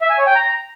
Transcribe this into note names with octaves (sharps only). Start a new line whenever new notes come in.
E5
G#5
C#5
G5
A#5